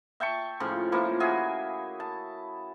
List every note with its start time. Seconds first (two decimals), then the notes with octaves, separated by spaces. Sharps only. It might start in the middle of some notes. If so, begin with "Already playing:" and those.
0.20 E5 G5 A5 C#6
0.60 A2 C#3 F3
0.92 F3 A#3 E4
1.20 F#4 G#4 E5 G#5
2.00 A5